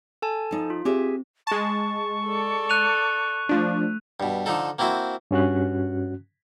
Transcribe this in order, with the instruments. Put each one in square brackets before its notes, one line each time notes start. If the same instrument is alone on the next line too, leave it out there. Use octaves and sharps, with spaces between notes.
[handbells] A4 G#5 A5
[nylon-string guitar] F3 D#4
[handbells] F4
[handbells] C4 [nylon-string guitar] G4 G#4 E5
[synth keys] G#3 A5 [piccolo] C#6
[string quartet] A4 D5
[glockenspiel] F#6 D#7 F7
[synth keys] F3 D4 [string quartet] A3
[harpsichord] G2 B2
D3 F3 D#4 A4
A#3 C4 E4 F#4 C5
[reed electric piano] G2 C#4 F#4 F#6